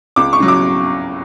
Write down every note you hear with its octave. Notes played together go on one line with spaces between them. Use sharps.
C#2 D6
C#6
C#3 F#3
D6